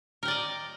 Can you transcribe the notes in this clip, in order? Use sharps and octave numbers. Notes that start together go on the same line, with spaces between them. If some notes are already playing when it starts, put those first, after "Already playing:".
A#4 D5 D#5 G5